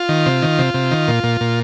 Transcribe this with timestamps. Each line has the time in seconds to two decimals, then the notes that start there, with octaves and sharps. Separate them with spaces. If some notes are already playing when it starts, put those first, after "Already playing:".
Already playing: F4
0.09 D#3
0.26 C3
0.42 D#3
0.59 C3
0.74 C3
0.91 D#3
1.08 A#2
1.24 A#2
1.41 A#2